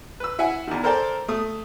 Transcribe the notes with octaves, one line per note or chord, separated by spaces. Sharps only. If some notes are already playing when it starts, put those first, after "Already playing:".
B4 E6
E4 E5 F#5 G#5
E2 D#3
A4 A#4 C5 D5 G5 A5
A3 D#6